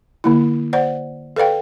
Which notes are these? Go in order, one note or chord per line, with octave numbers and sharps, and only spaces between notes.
D3 A#3 E4
C5 D5 F#5
A4 B4 D5 F5 G5